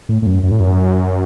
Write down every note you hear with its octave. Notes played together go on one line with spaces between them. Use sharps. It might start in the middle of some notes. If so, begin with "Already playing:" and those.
A2
A2
F#2
F#2
A2
F#2